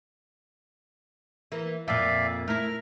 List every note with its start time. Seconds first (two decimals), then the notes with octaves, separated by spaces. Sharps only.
1.52 E3 A#3
1.88 F2 A#2 D5 E5 F5
2.48 A3 E4 A#4 F6